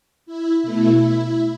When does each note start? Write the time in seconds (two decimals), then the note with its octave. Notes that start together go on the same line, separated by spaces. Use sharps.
0.26 E4
0.63 B2 A3 E4